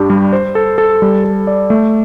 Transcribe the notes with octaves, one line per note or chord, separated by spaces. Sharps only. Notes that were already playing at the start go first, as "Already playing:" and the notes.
Already playing: G2 D4 G4
G3
C5
A4
A4
G3
A4
D5
A3